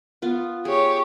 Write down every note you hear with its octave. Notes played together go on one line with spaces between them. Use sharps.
B3 F4
G4 G#4 C#5